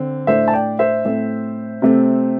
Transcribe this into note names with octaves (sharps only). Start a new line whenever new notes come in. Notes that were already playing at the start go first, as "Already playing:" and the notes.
Already playing: D3 C4
A2 A3 D4 C5 E5
A5
D5 G5
C5 E5
A2 A3 C4
C3 A3 C4